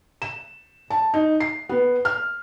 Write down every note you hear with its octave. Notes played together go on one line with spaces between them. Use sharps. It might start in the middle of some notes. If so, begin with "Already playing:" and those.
E7
A5
D#4
C7
B3
F6